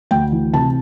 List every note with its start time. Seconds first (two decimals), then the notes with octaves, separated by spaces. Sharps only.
0.11 D2 G5
0.32 E3
0.54 C3 A5